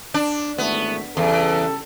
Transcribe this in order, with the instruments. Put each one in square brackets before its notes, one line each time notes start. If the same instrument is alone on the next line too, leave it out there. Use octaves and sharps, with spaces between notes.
[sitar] D4
[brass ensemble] G#1 E3 A3 [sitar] B3
[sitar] E2 [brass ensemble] C#3 G3 A4